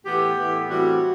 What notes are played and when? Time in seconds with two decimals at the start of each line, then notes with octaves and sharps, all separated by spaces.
0.05 A2 E3 B3 G4
0.37 A2 E3 B3
0.69 A2 E3 G3 C4 F#4